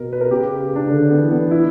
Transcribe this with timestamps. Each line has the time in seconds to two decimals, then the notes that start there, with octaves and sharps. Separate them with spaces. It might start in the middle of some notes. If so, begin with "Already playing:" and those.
Already playing: B2 A#4
0.13 B4
0.21 A#4
0.31 C#3 G4
0.76 D4
0.91 D3
1.10 B3
1.21 E3
1.31 B3
1.51 E4